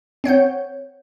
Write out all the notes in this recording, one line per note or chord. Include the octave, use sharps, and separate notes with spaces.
C4 C#5 F#5 G6